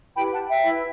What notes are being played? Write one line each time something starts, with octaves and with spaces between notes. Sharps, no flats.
E4 G4 B4 G5 B5
F#5 A5
E5 G5
E4
B4